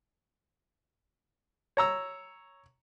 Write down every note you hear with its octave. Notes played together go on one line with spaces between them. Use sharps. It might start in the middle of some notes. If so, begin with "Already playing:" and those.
C#5 A#5 E6